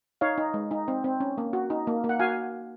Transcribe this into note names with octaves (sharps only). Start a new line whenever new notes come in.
D#4 C#5 F5
D#4
G#3
D#4
C4
C4
C#4
A#3
F#4
D#4
A#3
A#3
F#5
F#4 F5 G#5